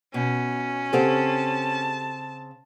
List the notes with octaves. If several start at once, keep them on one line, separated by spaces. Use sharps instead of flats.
B2 C#4
C#3 C4 G4 A4 F#5 A5